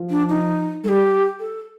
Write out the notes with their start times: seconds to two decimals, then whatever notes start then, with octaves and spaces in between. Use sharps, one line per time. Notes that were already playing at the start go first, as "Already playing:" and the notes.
Already playing: F3
0.10 D4
0.29 D#4
0.84 G3 A4
0.89 G4
1.40 A4